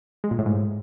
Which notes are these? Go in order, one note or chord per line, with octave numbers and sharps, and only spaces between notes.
G#3
A#2
A2
G#2